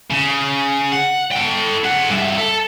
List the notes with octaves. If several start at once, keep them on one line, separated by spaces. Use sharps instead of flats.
C#3
F#5
A4 G5
G#4 F#5
G2 E5
A4